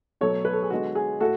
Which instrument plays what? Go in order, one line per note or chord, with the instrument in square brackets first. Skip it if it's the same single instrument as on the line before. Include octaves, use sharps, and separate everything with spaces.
[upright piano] B2 F#3 A3 A4 C#5
B4
A4
G#4
D3 G#3 B3 F#4
G#4
A2 F#4 A4